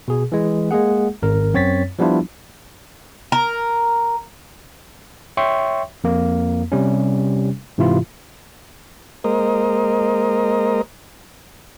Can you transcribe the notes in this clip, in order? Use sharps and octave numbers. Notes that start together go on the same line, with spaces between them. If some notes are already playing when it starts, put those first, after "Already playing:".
B2 G#4
E3 G#3
G#3 A#3 G#4 F#5
G#1 A#4
F#2 C4 C#5 A6 B6
F3 G3 B3 D4 E4 F4
A#4
C#5 E5 G5 C6 C#6
F2 A#3
C3 G3 C#4
G#2 C3 E3 E4 F4
G#3 A#3 A#4 C5 D#5